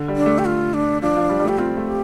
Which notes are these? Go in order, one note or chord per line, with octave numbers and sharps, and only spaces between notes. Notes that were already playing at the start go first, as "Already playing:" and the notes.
Already playing: D3
G3
D4
A3
G4
F4
D4
F3 D4
F3
G3
G3
A3 G4
C4 F4
A3
G4